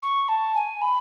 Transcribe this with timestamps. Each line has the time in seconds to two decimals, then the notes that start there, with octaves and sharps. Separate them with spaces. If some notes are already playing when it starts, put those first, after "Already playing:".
0.02 C#6
0.28 A5
0.55 G#5
0.81 B5